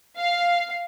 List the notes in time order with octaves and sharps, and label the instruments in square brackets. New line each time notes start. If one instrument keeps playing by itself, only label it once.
[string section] F5